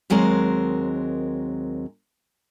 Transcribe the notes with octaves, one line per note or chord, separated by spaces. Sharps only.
D#2 F#3 G#3 C4 A#4